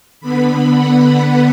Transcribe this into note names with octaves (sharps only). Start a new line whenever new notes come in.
D3 B3 B5
F#5